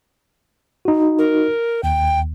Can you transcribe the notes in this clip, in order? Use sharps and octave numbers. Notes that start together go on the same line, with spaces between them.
D#4 F#4
A#4
D#2 G5